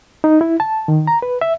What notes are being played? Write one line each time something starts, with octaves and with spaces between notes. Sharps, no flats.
D#4
E4
A5
D#3
A#5
B4
E5